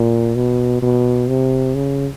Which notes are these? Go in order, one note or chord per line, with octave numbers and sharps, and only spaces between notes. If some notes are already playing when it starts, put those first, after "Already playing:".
Already playing: A#2
B2
B2
C3
C#3